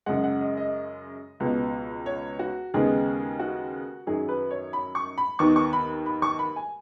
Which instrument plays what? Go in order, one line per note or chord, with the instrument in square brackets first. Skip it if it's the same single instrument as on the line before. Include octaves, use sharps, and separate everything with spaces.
[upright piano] F#2 C#3 G#3 F#5
F#5
D#5
D#5
C#2 B2 B3
C#5
F#4
D#2 C#3 G#3 B3 G#4
F#4
F#2 D#3 F#3 G#4
B4
C#5
B5
C#6
B5
D#2 D#3 B3 C#6
C#6
B5
B5
C#6
B5
G#5